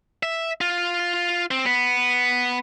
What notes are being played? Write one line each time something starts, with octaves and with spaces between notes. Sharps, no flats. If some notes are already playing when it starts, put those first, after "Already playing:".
E5
F4
C4
B3